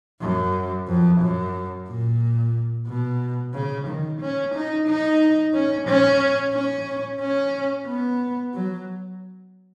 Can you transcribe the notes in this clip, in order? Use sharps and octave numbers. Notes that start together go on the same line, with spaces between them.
F#2
F2
F#2
A#2
B2
C#3
D#3
C#4
D#4
D#4
C#4
C#4
C#4
C#4
B3
F#3